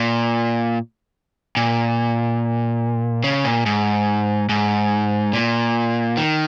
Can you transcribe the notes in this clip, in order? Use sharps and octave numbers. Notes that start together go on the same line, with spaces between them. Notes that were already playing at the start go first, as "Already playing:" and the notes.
Already playing: A#2
A#2
C#3
A#2
G#2
G#2
A#2
D#3